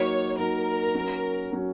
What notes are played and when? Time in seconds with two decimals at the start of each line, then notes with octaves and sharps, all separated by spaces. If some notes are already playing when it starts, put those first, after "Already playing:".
Already playing: F#3 A#3 D#4 F#4 C#5
0.38 F#3 A#3 D#4 F#4 A#4
0.94 F#3 C#4 F#4
1.51 F#3 C#4 F#4